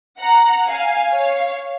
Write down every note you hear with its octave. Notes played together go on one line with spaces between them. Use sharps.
F#5 A#5
F5 G#5
C#5 F5